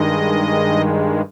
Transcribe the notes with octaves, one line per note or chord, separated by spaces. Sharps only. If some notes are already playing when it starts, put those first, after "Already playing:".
Already playing: G2 D#3 G#3 D#5